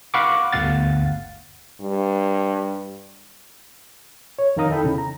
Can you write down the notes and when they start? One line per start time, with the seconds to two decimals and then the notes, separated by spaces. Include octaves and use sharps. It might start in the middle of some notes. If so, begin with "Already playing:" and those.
0.14 F5 F#5 B5 C#6 D6
0.52 G1 D2 F5 F#5 A6
1.81 G2
4.39 C#5
4.56 F2 D#3 A#4 F5 A#5 D#6
4.69 D#4 E4 A4 G5 B5
4.83 E2 C#3
4.98 A#5